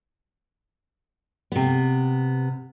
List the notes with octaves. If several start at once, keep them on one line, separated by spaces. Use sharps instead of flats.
C3 B3